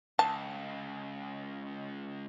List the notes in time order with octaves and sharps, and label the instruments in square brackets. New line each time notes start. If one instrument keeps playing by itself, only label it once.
[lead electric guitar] C#2 [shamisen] A5